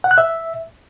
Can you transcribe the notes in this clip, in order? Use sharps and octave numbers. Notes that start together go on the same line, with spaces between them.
F#5
F#6
E5